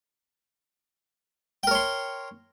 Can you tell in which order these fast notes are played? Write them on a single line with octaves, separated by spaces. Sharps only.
G5 A#4 C#5 C6